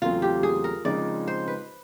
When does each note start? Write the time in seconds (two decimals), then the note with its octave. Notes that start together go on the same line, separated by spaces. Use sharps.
0.02 E2 C#3 F#3 A3 C4 F4
0.22 G4
0.43 G#4
0.64 A#4
0.85 C#3 F3 G#3 C4 D#4 D5
1.28 C5
1.48 B4